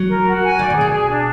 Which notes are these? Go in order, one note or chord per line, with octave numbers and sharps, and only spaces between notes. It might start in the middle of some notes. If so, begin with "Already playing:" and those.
Already playing: F#3
A#4
F#4
G#5
D#3 D5
B2
G#4
B2
G#4
D4